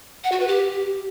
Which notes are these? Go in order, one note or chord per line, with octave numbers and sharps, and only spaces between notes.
F#5
F#4
B4
G4